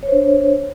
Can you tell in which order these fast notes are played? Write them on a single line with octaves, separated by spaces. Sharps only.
C#5 C5 D4